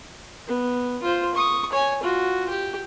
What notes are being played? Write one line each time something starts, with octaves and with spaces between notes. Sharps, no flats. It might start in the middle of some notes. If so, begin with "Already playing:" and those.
B3
F4 C5
C#6 D#6
C#5 G#5
F4 F#4
G4